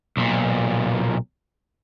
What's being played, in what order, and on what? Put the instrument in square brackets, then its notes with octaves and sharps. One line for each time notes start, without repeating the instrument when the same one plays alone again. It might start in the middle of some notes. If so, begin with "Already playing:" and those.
[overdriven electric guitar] B1 A#2